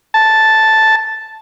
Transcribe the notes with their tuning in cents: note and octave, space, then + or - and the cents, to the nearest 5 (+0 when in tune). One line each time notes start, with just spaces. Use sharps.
A5 -5